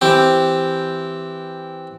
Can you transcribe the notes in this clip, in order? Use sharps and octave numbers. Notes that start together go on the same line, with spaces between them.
E3 C4 G4